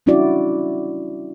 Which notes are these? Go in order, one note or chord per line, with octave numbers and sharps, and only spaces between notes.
G3 C#4 D4 E4 F#4 D5